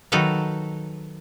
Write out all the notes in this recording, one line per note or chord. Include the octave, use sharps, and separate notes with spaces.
D#3 F#3 D#4 A4 B4 F5